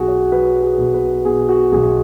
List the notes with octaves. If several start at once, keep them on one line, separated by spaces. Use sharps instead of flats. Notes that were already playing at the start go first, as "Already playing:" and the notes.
Already playing: B1 B2 F#4 G#4 F#5
C#5
F#3 B4
G#4
B1
B4
B2 G#4
F#4
B1 G#4